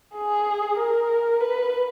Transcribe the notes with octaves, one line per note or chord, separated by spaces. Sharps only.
G#4
A#4
B4